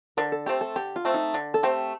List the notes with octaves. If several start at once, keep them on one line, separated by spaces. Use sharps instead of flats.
D3 A#4
A4
A3 C4 G4
A4
D3 G4
F4
A3 C4
D#4
D3
A4
A3 C4 G4